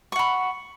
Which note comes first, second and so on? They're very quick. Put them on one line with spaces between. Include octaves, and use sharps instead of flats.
C#6 F#5 B5